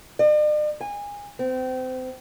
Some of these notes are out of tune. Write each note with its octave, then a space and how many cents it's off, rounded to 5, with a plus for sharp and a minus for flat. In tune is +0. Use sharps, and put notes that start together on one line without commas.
D5 +45
G#5 -25
C4 -30